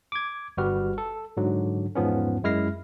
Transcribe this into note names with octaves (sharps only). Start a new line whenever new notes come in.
D6 G#6
G1 G3 F#4 G4 B4 F6
A4
G#2 D3 F#3
E2 G#2 F3 B3 C#4
F#2 G#3 E4 F6 A#6 C7